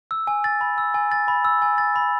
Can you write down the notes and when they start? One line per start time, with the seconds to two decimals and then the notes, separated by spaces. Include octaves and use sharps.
0.11 E6
0.27 G#5
0.44 A6
0.61 B5
0.78 E6
0.94 G#5
1.12 A6
1.28 B5
1.45 E6
1.62 G#5
1.78 A6
1.96 B5